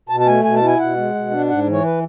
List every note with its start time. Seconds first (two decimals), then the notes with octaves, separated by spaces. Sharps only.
0.09 B2 A5
0.20 A5
0.27 A3 G#5
0.44 B2 G#5
0.56 A5
0.62 E4
0.67 G#5
0.79 B2 F#5
0.97 G#3
1.15 B2
1.31 D4
1.49 G#2 F#5
1.67 E3
1.72 C#5
1.84 B4